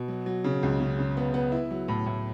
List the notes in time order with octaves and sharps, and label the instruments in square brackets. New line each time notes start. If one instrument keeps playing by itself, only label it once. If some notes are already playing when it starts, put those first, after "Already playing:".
Already playing: [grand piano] B2
F#3
F#3
C#3
C#2
C#3
C#3
B3
B3
E4
F#3
A2
A2